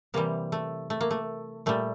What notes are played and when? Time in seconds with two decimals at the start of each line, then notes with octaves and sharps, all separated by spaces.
0.14 C3 E3 G3 A#3
0.52 A3
0.90 A3
1.01 A#3
1.11 A3
1.66 A#2 G3 A3